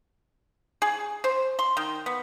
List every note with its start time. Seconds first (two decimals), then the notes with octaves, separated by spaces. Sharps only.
0.82 G#4
1.24 C5
1.59 C6
1.77 D#3
2.06 B3